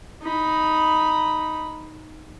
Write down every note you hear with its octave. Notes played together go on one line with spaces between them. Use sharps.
D#4 B5